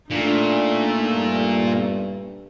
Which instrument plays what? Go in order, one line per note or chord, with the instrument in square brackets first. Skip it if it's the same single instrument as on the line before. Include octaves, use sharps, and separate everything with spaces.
[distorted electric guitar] A#2 [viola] A3 D#4 [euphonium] D4
[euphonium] G2